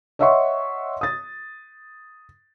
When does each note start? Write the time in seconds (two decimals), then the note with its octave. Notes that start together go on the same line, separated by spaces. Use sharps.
0.19 C#5 D#5 E5 F#5 C6 C#6
1.01 D#6 A6